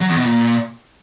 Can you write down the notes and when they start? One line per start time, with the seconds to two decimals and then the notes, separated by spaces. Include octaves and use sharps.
0.01 F#3
0.09 E2
0.17 B2
0.25 A#2